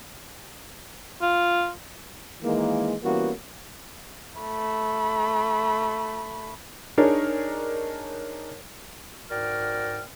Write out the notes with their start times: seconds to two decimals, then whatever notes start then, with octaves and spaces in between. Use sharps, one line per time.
1.22 F4
2.43 D#3 E3 G#3 A#3
3.03 E3 G3 A#3 B3 C#4 F#4
4.40 A3 B5
6.98 D4 D#4 G#4 A#4 C#5
9.30 G#2 F#4 A#4 D5 G5 F6